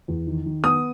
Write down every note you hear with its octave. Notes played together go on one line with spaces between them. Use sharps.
E2
D#3
D#3
B3 D#6